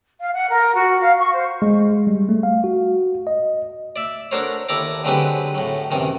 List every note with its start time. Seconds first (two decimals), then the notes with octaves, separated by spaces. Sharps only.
0.20 F5
0.32 F#5
0.50 A#4
0.75 F#4
1.00 F5
1.18 C#6
1.32 C5
1.62 G#3
2.07 G3
2.29 A3
2.43 F5
2.64 F#4
3.27 D#5
3.96 D5 E5
4.31 D4 F#4 A4 A#4 C5 C#5
4.69 D#2 E4 A4 D5 A#5 D6
5.04 D3 F#3 G#3 C4 G4 B4
5.54 A2 F#3
5.91 F#2 C3 D#3 E3